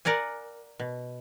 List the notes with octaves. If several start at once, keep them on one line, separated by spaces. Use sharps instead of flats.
A#4 D5 F#5 G#5
B2